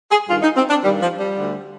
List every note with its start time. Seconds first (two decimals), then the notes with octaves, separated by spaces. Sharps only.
0.11 G#4
0.29 G2 D#3 F4
0.42 D#4
0.57 C4
0.70 D4
0.83 G2 D#3 G3
1.01 F3
1.19 G3
1.36 D2 D3